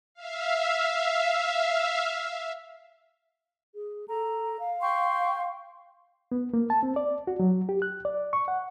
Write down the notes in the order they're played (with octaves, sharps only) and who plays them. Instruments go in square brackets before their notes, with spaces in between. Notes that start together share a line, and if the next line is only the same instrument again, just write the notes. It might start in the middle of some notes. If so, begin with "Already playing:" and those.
[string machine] E5 F5
[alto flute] G#4
[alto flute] A4 [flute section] A#5
[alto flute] F5
[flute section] G5 C6 C#6
[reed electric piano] B3
A#3
A5
C4
D5
F#4
F#3
G4
F#6
D5
C#6
F#5